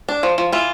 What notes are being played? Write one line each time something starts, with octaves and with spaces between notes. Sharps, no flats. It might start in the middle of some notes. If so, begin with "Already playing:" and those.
D4
F3
F3
E3 F4